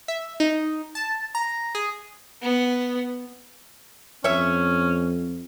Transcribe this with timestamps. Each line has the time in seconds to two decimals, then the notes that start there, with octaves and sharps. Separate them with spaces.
0.08 E5
0.40 D#4
0.95 A5
1.35 A#5
1.75 G#4
2.42 B3
4.24 F2 C#4 C#5 E5